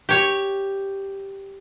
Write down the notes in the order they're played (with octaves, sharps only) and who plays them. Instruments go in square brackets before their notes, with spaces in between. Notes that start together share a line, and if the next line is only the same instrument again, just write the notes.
[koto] G4 C#5